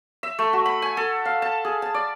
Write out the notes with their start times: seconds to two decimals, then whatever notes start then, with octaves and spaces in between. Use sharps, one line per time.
0.23 E5
0.39 A3
0.53 F#4
0.66 B5
0.82 G#5
0.97 A4
1.25 F5
1.42 A5
1.65 G#4
1.82 A5
1.94 D5